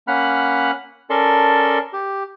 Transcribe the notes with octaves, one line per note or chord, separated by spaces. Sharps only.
A#3 C#4 F#5 B5 F6 F#6
C#4 A4 A#4 D5 A5 C6
G4